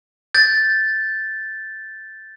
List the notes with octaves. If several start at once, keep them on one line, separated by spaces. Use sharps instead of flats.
G6 A6